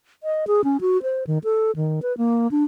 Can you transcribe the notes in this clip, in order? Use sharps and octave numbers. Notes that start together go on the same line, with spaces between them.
D#5
G#4
C#4
F#4
C5
D#3
A4
D#3
B4
A#3
D4